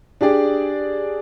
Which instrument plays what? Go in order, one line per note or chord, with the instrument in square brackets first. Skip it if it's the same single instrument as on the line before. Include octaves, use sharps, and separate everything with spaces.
[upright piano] D4 G4 G#4 D5